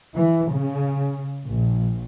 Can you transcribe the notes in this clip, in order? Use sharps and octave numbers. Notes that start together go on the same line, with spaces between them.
E3
C#3
A#1